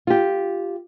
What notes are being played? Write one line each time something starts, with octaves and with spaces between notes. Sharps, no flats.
F4 G4